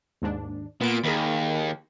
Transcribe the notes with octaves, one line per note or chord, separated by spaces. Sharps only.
D#2 G#2 D4
A#2 B3 D7
D#2 G#4 A#4 B5